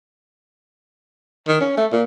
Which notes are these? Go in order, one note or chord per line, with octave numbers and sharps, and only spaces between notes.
D#3
C#4
A3
A#2